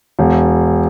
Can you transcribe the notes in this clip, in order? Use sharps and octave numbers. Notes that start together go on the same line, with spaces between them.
E1